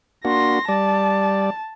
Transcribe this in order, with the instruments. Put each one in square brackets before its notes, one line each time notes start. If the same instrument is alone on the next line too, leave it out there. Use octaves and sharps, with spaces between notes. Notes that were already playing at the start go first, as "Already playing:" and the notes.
[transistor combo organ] A#3 D4 F#4 [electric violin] C6 A#6
[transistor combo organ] G3 D5 [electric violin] A5